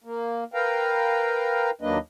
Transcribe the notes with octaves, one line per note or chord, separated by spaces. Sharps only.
A#3
A#4 B4 F5 G5 A#5
D#2 F#3 A#3 D4 B4 D#5